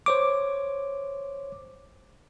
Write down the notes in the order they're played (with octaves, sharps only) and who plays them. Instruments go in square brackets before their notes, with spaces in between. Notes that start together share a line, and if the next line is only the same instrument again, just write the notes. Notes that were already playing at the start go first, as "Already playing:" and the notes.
[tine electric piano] C5 C#5 D6